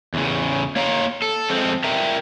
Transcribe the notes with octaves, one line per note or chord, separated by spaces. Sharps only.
E2 C#3
A#3 C#5 F5 A#5
A4
F2 G#3 C4 A4
A#4 E5 G5 A#5